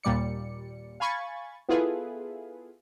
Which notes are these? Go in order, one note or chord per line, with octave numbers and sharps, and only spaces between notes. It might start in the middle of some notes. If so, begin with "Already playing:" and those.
D#2 A#2 G3 D5 C#7
F5 G#5 B5 C#6 G#6 A6
B3 E4 F4 G#4 A4 B4